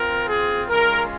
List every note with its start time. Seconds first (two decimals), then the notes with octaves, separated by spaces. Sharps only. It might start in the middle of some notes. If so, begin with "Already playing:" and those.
Already playing: C4 F4 A#4
0.28 G#4
0.69 G#3 C#4 F4 A#4